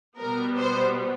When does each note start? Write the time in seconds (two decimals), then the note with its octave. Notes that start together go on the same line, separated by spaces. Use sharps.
0.19 B2 G3 B3 A#4
0.57 C5